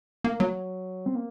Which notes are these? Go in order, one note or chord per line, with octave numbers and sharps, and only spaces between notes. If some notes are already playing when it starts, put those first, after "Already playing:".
A#3
F#3
C4
A#3